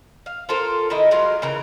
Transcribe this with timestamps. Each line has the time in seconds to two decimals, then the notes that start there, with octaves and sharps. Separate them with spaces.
0.26 F5
0.49 F4 A4 A#4 C5
0.90 D#3 A3 E4 D#5
1.11 F#3 G#3 F4 A#4
1.42 C#3 E3 A#4